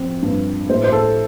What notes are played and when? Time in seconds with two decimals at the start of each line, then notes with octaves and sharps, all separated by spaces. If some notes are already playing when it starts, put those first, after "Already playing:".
Already playing: F3 C4
0.22 G2
0.69 A2 C5
0.84 C5
0.92 A4